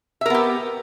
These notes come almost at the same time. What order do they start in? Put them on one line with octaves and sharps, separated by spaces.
E5 A#4 B3 G4